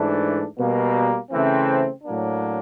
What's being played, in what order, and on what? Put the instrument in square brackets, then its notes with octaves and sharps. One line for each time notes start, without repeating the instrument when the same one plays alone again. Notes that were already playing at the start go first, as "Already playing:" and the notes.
Already playing: [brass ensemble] G#2 E3 A3 D4
B2 G3 A#3
C#3 E3 A3 C4
A2 F#3 A#3 D4